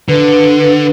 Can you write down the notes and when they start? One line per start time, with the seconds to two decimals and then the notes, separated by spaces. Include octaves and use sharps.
0.08 D3 B4